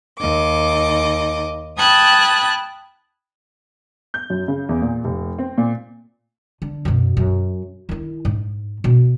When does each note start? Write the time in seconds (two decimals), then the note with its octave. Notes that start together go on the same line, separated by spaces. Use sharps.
0.18 D#2 D#5 D6
1.77 G5 A5 B5 D#6 F#6 G#6
4.14 G6
4.30 F#2
4.48 C#3
4.69 E2
4.82 A#2
5.04 F1
5.39 C4
5.58 A#2
6.62 D3
6.85 F#2 B2
7.17 F#2
7.89 D#3 E4
8.25 G#2
8.84 B2